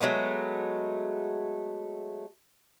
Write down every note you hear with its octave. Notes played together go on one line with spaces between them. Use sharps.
F#3 G#3 A3 B3